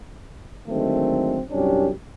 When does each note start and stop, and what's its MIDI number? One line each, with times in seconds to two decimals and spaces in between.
0.68 1.41 50
0.68 1.41 51
0.68 1.41 54
0.68 1.41 56
0.68 1.41 57
0.68 1.41 60
1.50 1.90 36
1.50 1.90 43
1.50 1.90 54
1.50 1.90 61
1.50 1.90 62
1.50 1.90 67